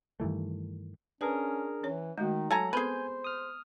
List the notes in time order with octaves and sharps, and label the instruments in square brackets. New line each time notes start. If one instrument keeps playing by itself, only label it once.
[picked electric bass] G2 D#3 E3 A3
[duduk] C#4 [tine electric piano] D4 G#4 A#4 [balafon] B4 A5
[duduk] E3 [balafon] C#4 C#5
[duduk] D#3 [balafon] G#3 A3 F#4 [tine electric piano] D#4
[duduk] F#3 [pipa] A4 G#5 A#5
[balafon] B3 C4 A4 [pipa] G#4 B4 [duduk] C5 [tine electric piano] G#5 G6
[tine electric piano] D#6 F6